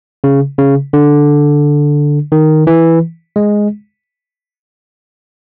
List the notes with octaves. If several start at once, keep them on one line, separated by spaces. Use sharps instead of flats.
C#3
C#3
D3
D#3
E3
G#3